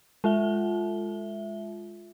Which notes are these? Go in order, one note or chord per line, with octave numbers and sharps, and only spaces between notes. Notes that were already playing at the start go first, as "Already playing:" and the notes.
G#3 F4 E5 G7